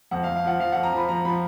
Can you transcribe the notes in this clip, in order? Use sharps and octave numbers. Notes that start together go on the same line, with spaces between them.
F2 F#5
F5
F2
F5
F3 F#5
F3 F5
F2 F#5
A#5
F3 B5
F3 A#5
F3 B5